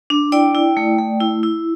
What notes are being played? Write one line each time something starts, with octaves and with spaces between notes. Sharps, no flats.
D4
E4 D5 G5
E4
A3
A3
E4
E4